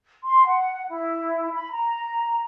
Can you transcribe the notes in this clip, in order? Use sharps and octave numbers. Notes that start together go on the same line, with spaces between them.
C6
F#5
E4
B5
A#5